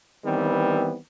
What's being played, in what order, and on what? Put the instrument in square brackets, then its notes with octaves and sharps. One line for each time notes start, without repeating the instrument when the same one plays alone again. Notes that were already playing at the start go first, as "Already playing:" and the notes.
[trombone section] D#3 E3 G3 B3 C4